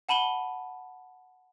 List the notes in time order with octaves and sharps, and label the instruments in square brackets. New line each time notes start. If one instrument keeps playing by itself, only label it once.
[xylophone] F#5 A5 B5 D#7 G7